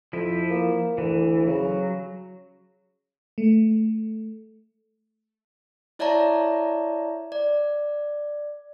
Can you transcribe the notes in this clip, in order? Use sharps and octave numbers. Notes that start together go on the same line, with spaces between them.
F2 F3 E4
A#3
D2 E3
C#3 F#3
A3
E4 C#5 D5 E5 A5 A#5
D5